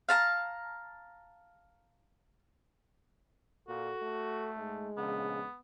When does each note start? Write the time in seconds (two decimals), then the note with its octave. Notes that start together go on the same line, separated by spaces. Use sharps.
0.09 F5 A5 A#5
3.68 A#2 F#4 A4
4.02 A3
4.59 G#2 G#3
4.97 A#1 C#3 B3